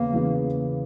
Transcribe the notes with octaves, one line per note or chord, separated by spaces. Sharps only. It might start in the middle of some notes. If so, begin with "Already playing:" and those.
Already playing: E2 C#3 E3 A#3 B3
E2 C#3 E3 B3